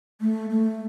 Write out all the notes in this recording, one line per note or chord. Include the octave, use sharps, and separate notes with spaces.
A3
A3